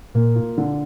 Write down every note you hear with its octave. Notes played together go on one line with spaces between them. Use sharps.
A#2 A#3
F4
D3